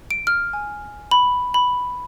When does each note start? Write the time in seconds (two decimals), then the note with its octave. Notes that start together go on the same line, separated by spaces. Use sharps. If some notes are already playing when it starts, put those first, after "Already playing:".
0.11 D7
0.27 F6
0.53 G#5
1.11 B5
1.54 B5